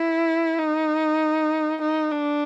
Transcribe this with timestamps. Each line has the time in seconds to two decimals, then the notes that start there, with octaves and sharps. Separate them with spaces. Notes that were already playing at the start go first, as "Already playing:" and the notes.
Already playing: E4
0.58 D#4
1.81 D#4
2.11 D4